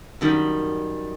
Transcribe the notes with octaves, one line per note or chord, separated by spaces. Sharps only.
F#2 D#3 G3